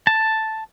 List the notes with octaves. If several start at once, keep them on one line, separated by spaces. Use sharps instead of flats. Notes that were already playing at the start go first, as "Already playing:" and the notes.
A5